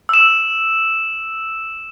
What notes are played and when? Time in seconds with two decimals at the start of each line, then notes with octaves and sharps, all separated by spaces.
0.09 E6 E7